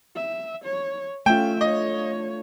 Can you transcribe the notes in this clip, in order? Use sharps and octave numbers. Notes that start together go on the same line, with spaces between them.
E5
C#5
A3 C#4 F4 E5 G5
D4 C#5 D#5